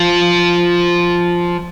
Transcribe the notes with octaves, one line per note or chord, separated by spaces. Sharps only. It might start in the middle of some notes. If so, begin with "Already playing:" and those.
Already playing: F3